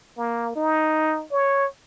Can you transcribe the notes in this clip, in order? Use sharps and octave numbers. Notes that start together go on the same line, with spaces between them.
A#3
D#4
C#5